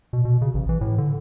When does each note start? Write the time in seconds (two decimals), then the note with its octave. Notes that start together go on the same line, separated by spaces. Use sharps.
0.13 B2
0.25 B2
0.41 C#3
0.54 A1
0.69 E3
0.81 A2
0.98 D3